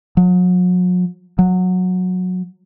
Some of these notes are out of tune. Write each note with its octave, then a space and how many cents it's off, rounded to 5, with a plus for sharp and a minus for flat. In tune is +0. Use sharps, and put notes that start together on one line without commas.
F#3 -40
F#3 -15